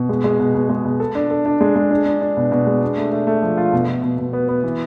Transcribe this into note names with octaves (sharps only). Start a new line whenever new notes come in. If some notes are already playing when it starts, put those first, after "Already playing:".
Already playing: B2
G#3
G#3
B2
B2
G#3
B2
A4
D4
A4
D4
G#3
G#3
D4
D4
D4
B2
B2
G#3
D4
A3
A3
A3
F3
F4
B2
B2
B2
B2
B3
B3
E3